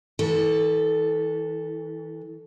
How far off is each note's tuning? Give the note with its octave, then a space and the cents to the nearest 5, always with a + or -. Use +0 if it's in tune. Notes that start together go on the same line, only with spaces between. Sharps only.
E3 -35 A4 +0